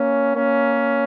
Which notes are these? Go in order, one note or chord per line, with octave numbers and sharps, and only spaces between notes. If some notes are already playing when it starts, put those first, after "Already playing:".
Already playing: A#3 C#4
A#3 C#4